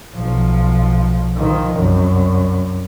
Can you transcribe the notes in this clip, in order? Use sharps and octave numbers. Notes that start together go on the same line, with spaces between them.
B1 F3
D#3 F3
C2 F#2